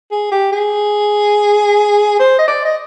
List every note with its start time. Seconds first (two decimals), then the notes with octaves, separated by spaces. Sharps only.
0.11 G#4
0.32 G4
0.52 G#4
2.20 C5
2.39 D#5
2.48 D5
2.65 D#5